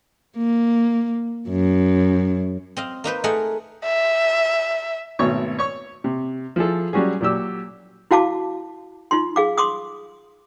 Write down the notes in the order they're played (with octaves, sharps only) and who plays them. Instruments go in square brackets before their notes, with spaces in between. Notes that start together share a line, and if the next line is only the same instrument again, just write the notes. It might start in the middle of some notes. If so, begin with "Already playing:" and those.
[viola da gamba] A#3
F#2
[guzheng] C4 D#5 F5
A#3 D#4 B4 C5
A3 D#4 G#4 A#4 F#5 G#5
[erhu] E5
[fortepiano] G#1 B2 A3 C#5 C#6
C#5 C#6
C3
F3 E4 G#4 A4
F#3 G3 C#4 F#4 G#4
A#2 F#3 G4 E6
[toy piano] E4 F#4 F5 A5 D6
D#4 F4 C6
G#4 F5 D6
C6 D6 D#6